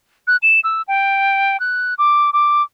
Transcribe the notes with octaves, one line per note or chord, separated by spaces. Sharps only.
F#6
E7
E6
G5
F#6
D6
D6